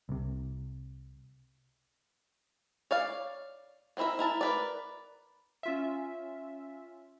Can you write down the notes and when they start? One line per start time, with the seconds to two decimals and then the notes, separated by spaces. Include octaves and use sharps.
0.09 C2 C3
2.91 C#5 D5 F5
3.97 B3 C4 E4 A#4 E5
4.19 E4 A#4 A5
4.41 A#4 B4 D5
5.63 C#4 F4 E5